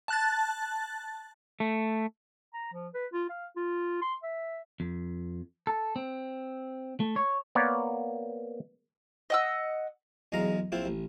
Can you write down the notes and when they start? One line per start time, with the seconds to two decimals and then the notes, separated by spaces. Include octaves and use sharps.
0.08 A5 F#6 A6
1.60 A3
2.54 A#5
2.72 F3
2.94 B4
3.13 F4
3.29 F5
3.57 F4
4.02 C6
4.23 E5
4.80 F2
5.67 A4
5.96 C4
7.00 A3
7.16 C#5
7.55 A#3 B3 A#4 C#5 D5
9.30 D#5 F#5 E6
10.32 B1 E2 G#3 F5 A#5
10.72 A#1 C4 E4 F4 C5
10.85 A1